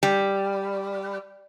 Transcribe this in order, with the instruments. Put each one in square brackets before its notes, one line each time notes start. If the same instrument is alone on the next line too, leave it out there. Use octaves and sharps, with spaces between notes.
[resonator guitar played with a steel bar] G3